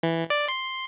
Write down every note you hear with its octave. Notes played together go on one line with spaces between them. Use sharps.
E3
D5
C6